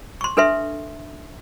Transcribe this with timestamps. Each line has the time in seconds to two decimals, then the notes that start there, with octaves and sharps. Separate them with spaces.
0.21 C6 C#6
0.37 D4 A4 B4 E5 C6